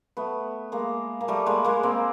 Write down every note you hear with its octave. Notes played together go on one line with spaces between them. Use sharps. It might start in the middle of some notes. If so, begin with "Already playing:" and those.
A3 B3
G#3 A#3
A#3
G3 A3
G#3 A#3
G#3 A#3
A#3 C4